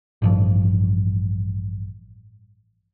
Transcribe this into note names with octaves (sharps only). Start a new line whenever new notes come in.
A1 G2 F3